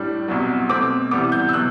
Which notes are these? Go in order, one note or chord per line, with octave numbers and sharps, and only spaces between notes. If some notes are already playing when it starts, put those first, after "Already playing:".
Already playing: A2 G3 D4
C2 B2 F#3
B2 A3 C4 D6
C3 E3 G3 B3 D6
G6
E6
B2 F#3 F#6